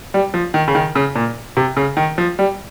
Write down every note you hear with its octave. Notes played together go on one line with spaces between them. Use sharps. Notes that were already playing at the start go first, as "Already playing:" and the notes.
G3
F3
D#3
C#3
D#3
C#3
A#2
C3
C#3
D#3
F3
G3